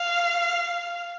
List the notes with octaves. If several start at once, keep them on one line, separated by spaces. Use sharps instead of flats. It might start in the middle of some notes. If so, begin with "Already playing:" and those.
Already playing: F5